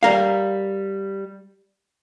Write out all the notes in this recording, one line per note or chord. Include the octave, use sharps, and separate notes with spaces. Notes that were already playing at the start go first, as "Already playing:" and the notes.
G3 A#4 F5